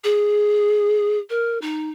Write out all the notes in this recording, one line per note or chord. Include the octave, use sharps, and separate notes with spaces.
G#4
A#4
D#4